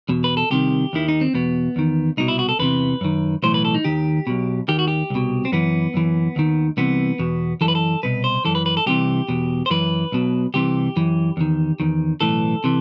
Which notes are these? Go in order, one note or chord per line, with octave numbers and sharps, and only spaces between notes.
E2 B2
B4
A4
C2 C3 D#3 G4
D#2 D#3 E4
D#4
C4
E2 B2 B3
E2 D#3
C2 B2 D#4
E4
F#4
A4
E2 C3 E3 B4
F#2 D#3
B1 A2 E3 C5
B4
A4
D#4
D#2 D#3 G4
B1 B2
D#2 D#3 G4
F#4
G4
C2 B2
C4
F#2 E3 B3
F#2 E3
D#2 D#3
C2 C3 E3 B3
E2 B2
F#2 E3 A4
B4
A4
C2 B2 B4
C5
F#2 E3 A4
B4
B4
A4
C2 C3 E3 G4
E2 B2
C5
F#2 E3 B4
B1 B2
C2 C3 E3 G4
F#2 E3
E2 D#3
E2 D#3
B1 A2 E3 A4
C3 E3